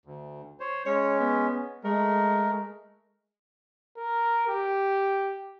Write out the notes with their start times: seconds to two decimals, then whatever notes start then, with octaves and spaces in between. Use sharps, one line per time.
0.05 D2
0.60 C5 C#5
0.86 G#3 C#4 C#5
1.20 B3
1.84 G#3 A3 A#4
3.97 A#4
4.48 G4